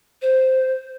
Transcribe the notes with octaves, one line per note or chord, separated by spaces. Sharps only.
C5